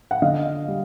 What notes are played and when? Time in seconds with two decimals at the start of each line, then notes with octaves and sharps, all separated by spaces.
0.11 F#5
0.22 D3 D#5 F5
0.68 G3